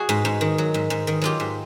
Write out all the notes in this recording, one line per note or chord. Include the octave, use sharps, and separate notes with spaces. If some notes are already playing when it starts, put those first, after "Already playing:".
Already playing: F#4 G#4
G#2
G#2
D#3
F#3
G#2
G#2
D#3
F#3 F4 G4
G#2